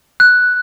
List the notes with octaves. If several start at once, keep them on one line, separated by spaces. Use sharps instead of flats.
F#6